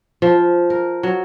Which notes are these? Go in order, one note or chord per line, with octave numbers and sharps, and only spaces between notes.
F3
A#4
F#3